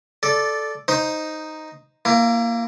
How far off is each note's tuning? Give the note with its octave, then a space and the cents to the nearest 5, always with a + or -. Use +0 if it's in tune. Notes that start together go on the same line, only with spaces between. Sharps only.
A4 -10 D5 +0
D#4 +0 C5 +0
A#3 +0 E4 +30